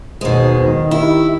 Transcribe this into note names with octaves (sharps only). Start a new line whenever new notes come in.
D#2 B2 G#3 D#4 C5
D#3
E4 G4